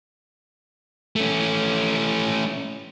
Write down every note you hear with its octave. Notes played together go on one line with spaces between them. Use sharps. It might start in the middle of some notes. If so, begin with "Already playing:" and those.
A3 C#4